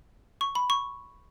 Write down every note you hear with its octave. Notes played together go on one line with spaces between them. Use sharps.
C#6
B5
C#6